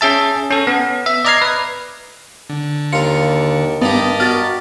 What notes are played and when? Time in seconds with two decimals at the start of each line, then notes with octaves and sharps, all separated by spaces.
0.01 C#4 G#4 E5 A5
0.50 C#4 A4
0.67 B3
1.06 E5
1.25 D5 D#5 A#5 F6 G#6 C7
1.42 B4
2.49 D3
2.93 D#2 F4 A#4 C#7
3.82 G2 B3 D#4 G4 A#4 D#5 A5
4.20 F#4 G4 D5 F6 A6